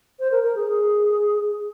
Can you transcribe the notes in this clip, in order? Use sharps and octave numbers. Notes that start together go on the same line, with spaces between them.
C5
A#4
A#4
G#4